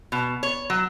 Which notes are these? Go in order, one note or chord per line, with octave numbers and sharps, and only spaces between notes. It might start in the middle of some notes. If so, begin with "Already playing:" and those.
B2
C#5
F#3